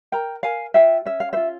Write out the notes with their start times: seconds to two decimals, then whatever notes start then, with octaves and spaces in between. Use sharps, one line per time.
0.12 A#4 G5 A#5
0.43 A#4 F5 G#5
0.74 F4 E5 G5
1.05 C#4 E5
1.20 F5
1.33 C5 E5
1.37 F4